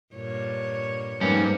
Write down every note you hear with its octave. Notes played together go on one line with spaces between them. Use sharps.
G2 A#2 C#5
F2 G#2 G3 A3 A#3 C#4 B4